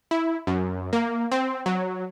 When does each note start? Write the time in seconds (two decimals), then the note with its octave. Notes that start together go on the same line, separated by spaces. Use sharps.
0.11 E4
0.47 F#2
0.93 A#3
1.32 C4
1.66 F#3